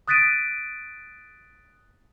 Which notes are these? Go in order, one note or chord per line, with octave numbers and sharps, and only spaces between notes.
D#6 F#6 A6 B6 D7 D#7